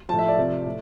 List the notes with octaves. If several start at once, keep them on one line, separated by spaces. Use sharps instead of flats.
A2 F3 A5
E5
D5
C3 F3
A2